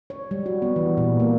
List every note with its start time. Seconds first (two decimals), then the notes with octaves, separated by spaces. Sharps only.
0.10 C#5
0.31 G3
0.46 F#4
0.62 B3
0.76 E3
0.97 A#2
1.20 A#3